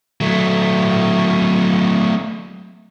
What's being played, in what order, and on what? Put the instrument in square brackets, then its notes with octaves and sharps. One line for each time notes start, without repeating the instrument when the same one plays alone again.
[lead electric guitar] F#3 A3